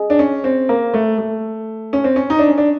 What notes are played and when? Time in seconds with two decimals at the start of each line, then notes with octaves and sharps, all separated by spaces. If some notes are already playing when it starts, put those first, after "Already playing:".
Already playing: G#4 D#5
0.10 D4
0.19 C#4
0.44 C4
0.69 A#3
0.94 A3
1.18 A3
1.93 C#4
2.04 C4
2.16 C#4
2.30 D#4
2.39 D4
2.49 C#4
2.58 D4